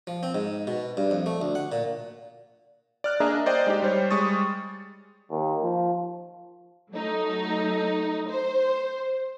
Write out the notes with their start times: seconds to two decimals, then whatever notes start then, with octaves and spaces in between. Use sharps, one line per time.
0.07 F3
0.23 C4
0.35 G#2
0.67 B2
0.97 G2
1.11 F2
1.26 A3
1.42 D2
1.55 F#5
1.72 A#2
3.04 D5 F6 F#6
3.20 A#3 D4 G#4 D#5 E5 A#5
3.46 C5 D5 D#5 G5
3.67 G#3 D#4 G4
3.82 G3 C5 C#5
4.10 G3 G#3 C#6 D#6 A6
5.31 D#2
5.63 F3
6.91 F#3 A3 D#4
8.29 C5